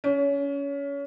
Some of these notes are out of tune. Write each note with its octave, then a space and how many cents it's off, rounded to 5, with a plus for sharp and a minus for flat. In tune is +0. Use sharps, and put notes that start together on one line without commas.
C#4 +25